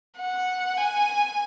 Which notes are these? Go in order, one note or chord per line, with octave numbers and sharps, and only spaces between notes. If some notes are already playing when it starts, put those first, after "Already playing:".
F#5
G#5